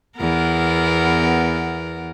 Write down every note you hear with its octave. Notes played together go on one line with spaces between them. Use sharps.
E2 B3 A#4